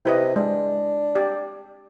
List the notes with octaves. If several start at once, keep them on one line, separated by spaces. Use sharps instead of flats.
C3 E4 B4 D#5
G#3 D4
G4 D5